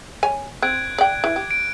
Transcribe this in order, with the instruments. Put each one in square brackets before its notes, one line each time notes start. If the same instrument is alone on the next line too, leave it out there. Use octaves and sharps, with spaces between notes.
[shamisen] C#5 G#5
[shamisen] C4 [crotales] F#6 G#6 D7
[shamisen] D5 G5
E3
G4
[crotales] D7